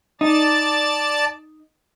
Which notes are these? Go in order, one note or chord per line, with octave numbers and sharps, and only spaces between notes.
D#4 D5 A5 A6